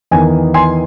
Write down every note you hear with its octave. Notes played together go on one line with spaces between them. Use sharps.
E2 D#3 G#5
G#5 C6